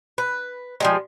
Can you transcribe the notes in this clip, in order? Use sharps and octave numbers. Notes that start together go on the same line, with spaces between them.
B4
F3 G3 G#3